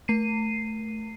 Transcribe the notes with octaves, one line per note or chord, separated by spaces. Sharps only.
A3 C7 D#7